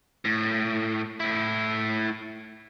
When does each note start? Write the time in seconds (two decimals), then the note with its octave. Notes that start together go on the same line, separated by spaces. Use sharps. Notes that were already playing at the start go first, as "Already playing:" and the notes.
0.25 A2
1.20 A2 E4